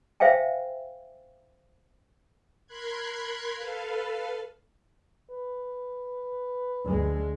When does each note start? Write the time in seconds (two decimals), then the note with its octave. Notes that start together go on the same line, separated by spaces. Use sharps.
0.20 C5 E5 F5 G5 G#5
2.67 A#4 B5 C6 F#6 G#6
3.55 A4 B4 F5
5.30 B4
6.84 D2 G#3